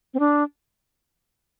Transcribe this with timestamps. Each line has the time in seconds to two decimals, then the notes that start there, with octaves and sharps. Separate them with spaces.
0.14 C4
0.19 D4